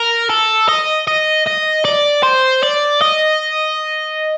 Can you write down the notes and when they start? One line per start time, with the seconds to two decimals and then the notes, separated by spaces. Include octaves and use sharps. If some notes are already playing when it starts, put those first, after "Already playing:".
Already playing: A#4
0.30 A4
0.69 D#5
1.07 D#5
1.46 D#5
1.85 D5
2.23 C5
2.63 D5
3.01 D#5